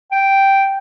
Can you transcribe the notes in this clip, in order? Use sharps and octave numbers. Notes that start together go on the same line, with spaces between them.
G5